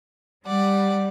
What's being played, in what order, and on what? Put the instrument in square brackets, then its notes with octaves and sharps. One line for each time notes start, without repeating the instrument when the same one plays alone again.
[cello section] G3 [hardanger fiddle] D5 F#5